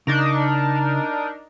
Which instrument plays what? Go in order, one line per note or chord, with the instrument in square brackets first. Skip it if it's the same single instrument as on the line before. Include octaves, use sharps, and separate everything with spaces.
[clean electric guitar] C#3 [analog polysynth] D4 D#4 A#4